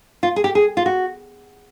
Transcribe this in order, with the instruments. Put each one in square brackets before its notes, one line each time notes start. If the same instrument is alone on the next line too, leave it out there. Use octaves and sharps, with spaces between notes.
[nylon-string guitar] F4
G#4
G4
G#4
F4
F#4